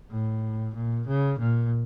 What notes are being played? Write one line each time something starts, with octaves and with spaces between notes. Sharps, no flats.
A2
A#2
C#3
A#2